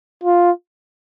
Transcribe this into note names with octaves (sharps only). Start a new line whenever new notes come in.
F4